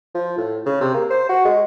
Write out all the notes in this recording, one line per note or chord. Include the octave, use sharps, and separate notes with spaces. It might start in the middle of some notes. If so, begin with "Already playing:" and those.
F3
A2
C#3
C3
A#3
C5
F#4
G#3